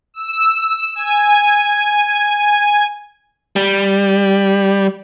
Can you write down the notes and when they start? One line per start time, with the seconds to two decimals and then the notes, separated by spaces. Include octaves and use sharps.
0.14 E6
0.95 G#5
3.56 G3